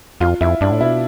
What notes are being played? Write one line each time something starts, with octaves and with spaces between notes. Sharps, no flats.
F2 F4
F2 E4
G2 D4
A2
B2 E4